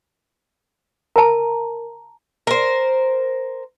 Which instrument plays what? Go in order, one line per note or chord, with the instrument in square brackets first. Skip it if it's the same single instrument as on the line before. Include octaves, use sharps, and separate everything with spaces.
[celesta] A#4 [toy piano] A5 A#5
[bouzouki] A#4 C5